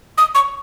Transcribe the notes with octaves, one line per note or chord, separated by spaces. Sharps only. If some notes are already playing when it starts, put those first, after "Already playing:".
D#6
C#6